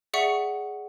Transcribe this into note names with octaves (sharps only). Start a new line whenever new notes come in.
G#4 D5 E5 F#5 C#6 C#7